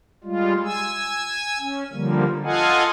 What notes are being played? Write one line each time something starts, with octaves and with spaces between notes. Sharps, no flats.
G3 G#3 F4
G#5 E6
C#4
D3 F3 G3 A#3
F4 A4 D#5 F5 F#5 G#5